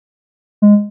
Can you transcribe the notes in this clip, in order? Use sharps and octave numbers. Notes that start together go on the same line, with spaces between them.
G#3